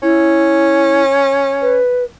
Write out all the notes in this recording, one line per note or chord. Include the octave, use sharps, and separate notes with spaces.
C#4 E4
B4